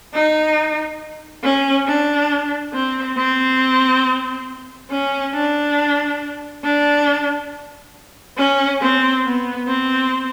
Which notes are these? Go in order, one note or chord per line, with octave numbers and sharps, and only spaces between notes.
D#4
C#4
D4
C4
C4
C#4
D4
D4
C#4
C4
B3
C4